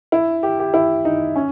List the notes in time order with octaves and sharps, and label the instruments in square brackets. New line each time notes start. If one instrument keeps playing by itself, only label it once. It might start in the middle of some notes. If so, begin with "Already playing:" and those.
[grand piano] E4
G4
G4
E4
D#4
C#4